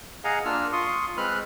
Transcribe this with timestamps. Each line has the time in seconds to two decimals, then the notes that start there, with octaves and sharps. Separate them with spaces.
0.24 G#4 D#5 F5 F#5 G#5 A#5
0.45 A#3 D4 F4 E6 F6
0.73 F4 C6 C#6 D#6
1.17 G#3 C4 B4 B5 F6 F#6